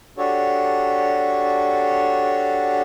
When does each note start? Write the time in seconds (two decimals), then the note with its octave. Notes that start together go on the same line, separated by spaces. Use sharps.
0.18 D4 F#4 G4 A4 C#5